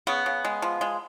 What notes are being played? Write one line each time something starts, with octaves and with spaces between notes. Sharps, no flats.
C#3 B3
C#3
G#3
F3
G#3